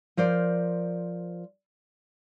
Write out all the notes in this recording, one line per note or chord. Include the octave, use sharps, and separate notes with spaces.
F3 A#4 C5 D5